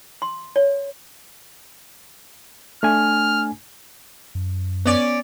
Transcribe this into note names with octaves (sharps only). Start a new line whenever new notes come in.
C6
C#5
A3 D4 G#5 F6
F#2
B3 C#4 D5